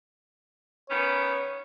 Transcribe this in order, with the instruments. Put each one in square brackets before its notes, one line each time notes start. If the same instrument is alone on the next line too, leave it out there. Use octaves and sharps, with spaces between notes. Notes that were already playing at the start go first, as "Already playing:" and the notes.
[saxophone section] D#3 B3 C#4 [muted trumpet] C#5